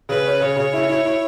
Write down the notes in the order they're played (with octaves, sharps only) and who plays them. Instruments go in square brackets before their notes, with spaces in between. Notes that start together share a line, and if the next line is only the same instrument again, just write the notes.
[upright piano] C#3 [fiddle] B4
[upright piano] C#4
[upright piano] C#3 [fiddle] C#5
[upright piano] C#3
E4
E4
E4